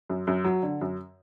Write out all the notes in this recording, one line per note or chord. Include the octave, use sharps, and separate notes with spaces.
F#2
F#2
F#3
D3
F#2